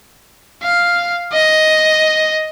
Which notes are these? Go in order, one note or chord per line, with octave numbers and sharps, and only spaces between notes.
F5
D#5